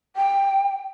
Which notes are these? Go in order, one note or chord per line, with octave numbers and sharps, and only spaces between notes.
G5